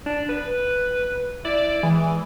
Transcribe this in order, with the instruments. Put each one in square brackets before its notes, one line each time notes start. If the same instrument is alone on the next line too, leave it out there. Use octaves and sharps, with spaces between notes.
[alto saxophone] D4
B4
[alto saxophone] E4 [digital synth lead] D5
[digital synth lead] E3 [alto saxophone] G#3